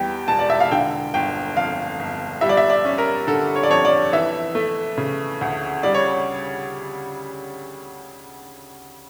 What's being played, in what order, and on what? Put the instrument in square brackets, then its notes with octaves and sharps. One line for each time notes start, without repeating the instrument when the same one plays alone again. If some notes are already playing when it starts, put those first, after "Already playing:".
Already playing: [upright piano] E2 G3 G5
E1 A5
D5
E5
F5
D3 G5
G1 G5
F2 F5
G1
G3 E5
D5
E5
D5
C#4
A#4
D3 A4
C#5
D5
F2 C#5
D5
E3 E5
A3
C#3
D2
G3 D5
C#5